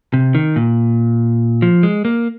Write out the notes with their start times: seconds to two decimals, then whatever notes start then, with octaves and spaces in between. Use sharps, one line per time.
0.13 C3
0.35 D#3
0.56 A#2
1.62 F3
1.83 G#3
2.05 A#3